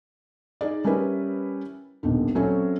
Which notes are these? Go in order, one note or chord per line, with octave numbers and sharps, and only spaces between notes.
D#4 G#4 D5
G3 C#4 E4 A#4 B4
D#1 B1 G#2 D3
F#3 C4 C#4 E4 A4 C#5